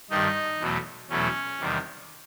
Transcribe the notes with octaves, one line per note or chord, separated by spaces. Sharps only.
G2 D#3 G3 D#4
E2 B2 F#3 A3
E2 B2 F#3 A3 C#4
E2 C3 D#3 G3